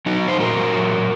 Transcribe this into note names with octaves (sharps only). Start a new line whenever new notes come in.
F#3 D#4 F#4
C5
A#2 F#4 A#4
F#3